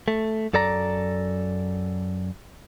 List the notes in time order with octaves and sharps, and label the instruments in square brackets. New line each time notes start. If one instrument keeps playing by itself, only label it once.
[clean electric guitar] A3
F#2 A4 D5 A#5